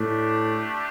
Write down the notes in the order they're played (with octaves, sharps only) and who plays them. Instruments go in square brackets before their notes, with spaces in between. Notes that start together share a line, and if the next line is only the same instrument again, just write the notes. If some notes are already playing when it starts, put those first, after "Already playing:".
Already playing: [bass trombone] A2 [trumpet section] A3 D4 G4